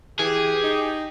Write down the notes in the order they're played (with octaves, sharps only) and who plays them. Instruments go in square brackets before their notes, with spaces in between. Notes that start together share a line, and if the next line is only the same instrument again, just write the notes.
[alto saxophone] E3 [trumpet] G4 [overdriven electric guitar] G#4
[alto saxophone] D#4